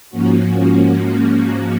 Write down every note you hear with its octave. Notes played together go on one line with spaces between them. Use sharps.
G#2 F3 A#3 C#4 F#4